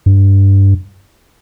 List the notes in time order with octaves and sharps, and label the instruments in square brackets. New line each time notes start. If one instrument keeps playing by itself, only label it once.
[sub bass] G2